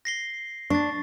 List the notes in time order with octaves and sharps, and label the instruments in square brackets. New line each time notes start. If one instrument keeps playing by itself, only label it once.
[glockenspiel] A#6 C7 G7
[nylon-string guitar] D4 [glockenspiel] C#6 A6